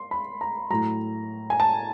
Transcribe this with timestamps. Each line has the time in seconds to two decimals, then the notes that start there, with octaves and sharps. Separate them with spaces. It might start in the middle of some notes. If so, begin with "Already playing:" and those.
Already playing: C6
0.11 B5
0.41 A#5
0.70 A2 F#3 A#5
1.50 G#5
1.60 A5